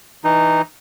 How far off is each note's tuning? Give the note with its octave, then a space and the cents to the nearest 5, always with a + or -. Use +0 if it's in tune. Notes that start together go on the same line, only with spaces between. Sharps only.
E3 -20 D#4 -10